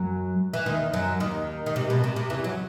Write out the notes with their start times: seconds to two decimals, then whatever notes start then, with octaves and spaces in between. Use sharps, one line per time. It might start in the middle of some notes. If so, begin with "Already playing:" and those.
Already playing: F#2 F#3
0.53 E3
0.66 D#2 D#3
0.93 F#2 F#3
1.20 D#2 D#3
1.66 D#3
1.76 C3
1.90 B2
2.04 C3
2.16 C3
2.30 E2 E3
2.44 F#3